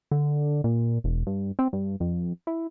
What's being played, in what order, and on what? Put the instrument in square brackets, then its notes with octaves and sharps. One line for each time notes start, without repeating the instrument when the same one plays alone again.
[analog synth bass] D3
A#2
E1
G2
C4
G2
F2
E4